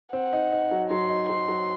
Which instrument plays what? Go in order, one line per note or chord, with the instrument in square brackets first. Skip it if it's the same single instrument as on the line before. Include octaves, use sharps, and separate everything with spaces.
[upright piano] C4 [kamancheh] F#5
[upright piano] D#4
D#4
F#3
[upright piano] F#3 [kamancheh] C6
[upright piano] D#4
[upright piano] F#3 [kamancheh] C6
[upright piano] F#3